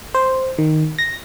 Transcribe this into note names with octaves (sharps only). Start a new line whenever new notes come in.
C5
D#3
A#6